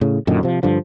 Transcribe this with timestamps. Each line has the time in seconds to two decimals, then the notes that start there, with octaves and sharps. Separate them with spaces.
0.01 A2 C#3
0.27 F#2 A#2 D3 D#3
0.43 C3 F3
0.63 G2 D3 F3